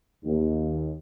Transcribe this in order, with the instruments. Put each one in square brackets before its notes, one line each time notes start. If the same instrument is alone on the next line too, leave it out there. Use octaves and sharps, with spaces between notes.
[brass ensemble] D#2